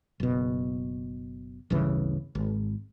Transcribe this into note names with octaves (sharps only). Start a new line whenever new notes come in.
F#1 B2
D1 G1 C#3 E3
G#1